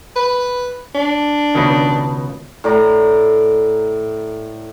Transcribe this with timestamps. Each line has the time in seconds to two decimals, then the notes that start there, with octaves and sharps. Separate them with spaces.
0.16 B4
0.95 D4
1.55 C#2 B2 D#3
2.64 A2 D5 A#5